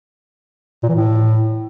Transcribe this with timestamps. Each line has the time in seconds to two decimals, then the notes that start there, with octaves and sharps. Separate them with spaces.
0.83 A#2
0.89 E3
0.95 A2